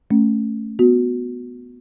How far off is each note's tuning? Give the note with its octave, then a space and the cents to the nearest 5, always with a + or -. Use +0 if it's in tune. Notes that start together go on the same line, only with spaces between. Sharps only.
A3 +0 C#4 +0
B3 +0 F#4 -20